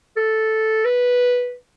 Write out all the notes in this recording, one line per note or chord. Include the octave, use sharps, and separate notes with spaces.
A4
B4